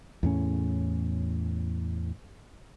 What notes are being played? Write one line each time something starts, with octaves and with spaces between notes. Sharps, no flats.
E2 A2 C#4